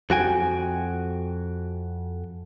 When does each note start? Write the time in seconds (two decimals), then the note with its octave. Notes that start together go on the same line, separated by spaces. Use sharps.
0.10 F2 F#4 G5 G#5